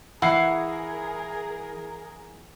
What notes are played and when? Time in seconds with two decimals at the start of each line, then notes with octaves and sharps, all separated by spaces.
0.22 E3 E4 G#4 A#4 F#5 C7